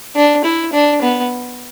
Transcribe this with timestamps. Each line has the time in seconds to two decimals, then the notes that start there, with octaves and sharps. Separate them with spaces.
0.15 D4
0.44 E4
0.73 D4
1.02 B3